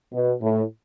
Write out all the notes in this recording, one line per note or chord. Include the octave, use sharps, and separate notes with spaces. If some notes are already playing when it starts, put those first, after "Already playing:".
B2
A2